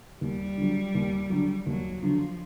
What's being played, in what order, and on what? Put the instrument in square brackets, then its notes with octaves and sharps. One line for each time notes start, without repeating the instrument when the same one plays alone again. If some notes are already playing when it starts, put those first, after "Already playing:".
[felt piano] D#2 [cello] G3
[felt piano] D3 F#3
D#2
D3 F#3
[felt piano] D#2 [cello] F#3
[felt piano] D3 F#3 [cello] F3